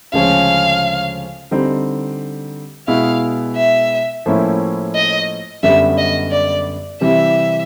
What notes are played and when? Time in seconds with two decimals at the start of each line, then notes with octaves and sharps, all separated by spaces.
0.13 D2 C#3 F3 G#3 C#4 F5
1.51 D3 G3 C4 D#4
2.88 B2 G#3 B3 E4 F5
3.56 E5
4.26 A2 F3 A#3 C#4 E4
4.95 D#5
5.63 F#2 D3 G3 B3 E5
5.98 D#5
6.31 D5
7.01 C3 E3 G3 C4 E5